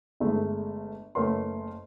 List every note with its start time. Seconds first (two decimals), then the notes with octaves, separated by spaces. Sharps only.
0.20 G1 G#3 A3
1.15 F#1 A3 B3 A#4 C#5 C6